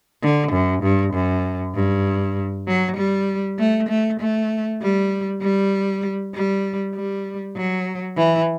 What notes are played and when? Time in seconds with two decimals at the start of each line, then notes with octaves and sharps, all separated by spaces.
0.22 D3
0.52 F#2
0.83 G2
1.14 F#2
1.75 G2
2.67 F#3
2.97 G3
3.59 A3
3.89 A3
4.20 A3
4.81 G3
5.42 G3
6.34 G3
6.95 G3
7.56 F#3
8.17 E3